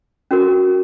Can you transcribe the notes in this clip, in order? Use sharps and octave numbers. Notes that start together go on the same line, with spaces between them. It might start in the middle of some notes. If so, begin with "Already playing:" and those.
C#4 F#4 A#4